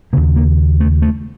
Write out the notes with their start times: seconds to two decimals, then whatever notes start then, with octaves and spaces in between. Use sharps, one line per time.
0.13 D#2 C#3 A#3
0.36 A#3
0.80 A3
1.02 A3